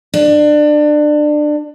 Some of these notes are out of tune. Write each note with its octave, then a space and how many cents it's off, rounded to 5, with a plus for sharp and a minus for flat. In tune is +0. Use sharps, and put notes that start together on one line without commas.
D4 +25